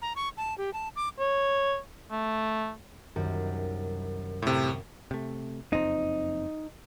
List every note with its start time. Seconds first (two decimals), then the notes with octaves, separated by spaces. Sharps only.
0.02 A#5
0.16 C#6
0.37 A5
0.58 G4
0.73 A5
0.96 D6
1.19 C#5
2.11 A3
3.16 C2 F#2 D#3
4.42 A2 C3
5.11 C3 A3
5.73 F#1 F2 C4 D#4